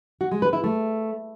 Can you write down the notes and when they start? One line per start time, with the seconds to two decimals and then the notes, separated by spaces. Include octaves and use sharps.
0.21 F#4
0.31 G#3
0.42 B4
0.53 E4
0.64 A3